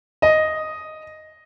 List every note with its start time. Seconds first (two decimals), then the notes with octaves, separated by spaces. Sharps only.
0.22 D#5